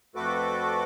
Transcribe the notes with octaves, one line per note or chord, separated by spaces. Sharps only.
F2 A3 F#4 A4 B4 D6